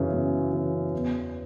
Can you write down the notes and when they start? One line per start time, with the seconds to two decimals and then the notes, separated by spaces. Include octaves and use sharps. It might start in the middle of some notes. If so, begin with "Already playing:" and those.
Already playing: F#2 C#3 E3
0.14 F#2
0.53 C#3 E3
0.93 E2